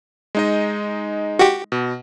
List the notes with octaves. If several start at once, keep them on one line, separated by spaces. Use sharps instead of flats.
G#3 D#4 D#5
F#4 G4
B2